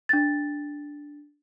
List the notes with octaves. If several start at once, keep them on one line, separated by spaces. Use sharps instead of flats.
D4 A6